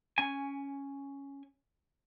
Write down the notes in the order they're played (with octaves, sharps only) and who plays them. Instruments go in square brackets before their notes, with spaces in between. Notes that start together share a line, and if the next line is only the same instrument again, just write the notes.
[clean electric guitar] C#4 G#5